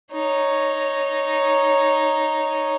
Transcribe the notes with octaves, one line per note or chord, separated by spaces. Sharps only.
D#4 C#5